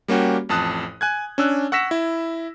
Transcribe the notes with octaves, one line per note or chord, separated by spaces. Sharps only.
G3 A#3 C#4 F#4 G4
A1 F2 A5 D#6 F#6
G#5 F#6 G#6
C#4 D4 E6 F#6
F#5 C#6 E6 A#6 B6 E7
E4